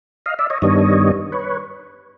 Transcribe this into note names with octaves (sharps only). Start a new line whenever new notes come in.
D#5 F5
D5 E5
C#5 D#5
G2 D#3 G3 B3 D4 C#5 D#5
B4 C#5